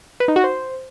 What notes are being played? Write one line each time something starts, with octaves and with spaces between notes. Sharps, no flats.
B4
D#4
F#4
C5